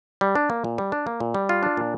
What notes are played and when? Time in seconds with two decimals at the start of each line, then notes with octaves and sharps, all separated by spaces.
0.21 G3
0.35 D4
0.50 A#3
0.64 A#2
0.78 G3
0.92 D4
1.07 A#3
1.20 A#2
1.34 G3
1.49 F4
1.63 D4
1.77 A#2